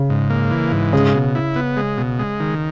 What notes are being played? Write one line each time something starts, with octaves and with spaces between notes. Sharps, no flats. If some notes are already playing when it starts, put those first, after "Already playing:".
Already playing: C#3
G#2
A#3
E3
G#2
C#3 G#3
B2
E4
B3
G#3
B2
G#3
D#3